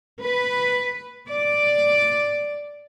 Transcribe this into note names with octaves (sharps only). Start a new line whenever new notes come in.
B4
D5